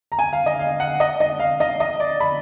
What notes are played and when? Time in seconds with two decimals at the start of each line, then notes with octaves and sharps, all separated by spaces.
0.12 A#5
0.19 G#5
0.33 F5
0.46 D#5
0.59 F5
0.80 F#5
1.00 D#5
1.20 D#5
1.40 F5
1.60 D#5
1.80 D#5
2.00 D5
2.20 B5